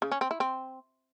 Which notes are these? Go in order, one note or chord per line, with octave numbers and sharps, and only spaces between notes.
C#3
C#4
C4
E4
C4